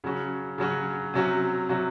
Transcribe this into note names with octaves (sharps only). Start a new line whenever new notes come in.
C#3 F#3 C#4 F#4
C#3 F#3 C#4 F#4
C3 F#3 C#4 F#4
C3 F#3 C#4 F#4